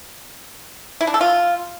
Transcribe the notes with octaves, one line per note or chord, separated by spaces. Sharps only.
E4
D4
A4
F4